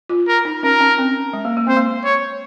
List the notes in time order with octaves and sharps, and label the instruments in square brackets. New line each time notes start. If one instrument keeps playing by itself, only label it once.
[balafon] F4
[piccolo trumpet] A#4
[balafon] D#4
[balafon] C#4 [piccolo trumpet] A#4
[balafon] C#4
C4
G#3
A#3
A#3
[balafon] C4 [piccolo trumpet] C5
[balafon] A#3
[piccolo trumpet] C#5